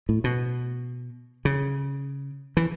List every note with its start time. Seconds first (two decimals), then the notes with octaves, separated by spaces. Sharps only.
0.09 A2
0.24 B2
1.45 C#3
2.57 E3